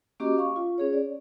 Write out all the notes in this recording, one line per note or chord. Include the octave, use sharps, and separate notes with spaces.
A#3 C#4 F#4 G4 D#5 D6
F5 C#6
F4
C#4 G#4 C#5
D5